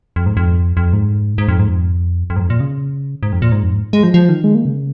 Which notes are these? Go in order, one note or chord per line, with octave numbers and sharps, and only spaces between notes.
F2
G#2
F2
F2
G#2
G#2
F2
G#2
F2
F2
G#2
F2
A#2
C#3
G#2
F2
A#2
G#2
F2
G#2
G#3
F3
F3
D#3
G#3
A#3
C#3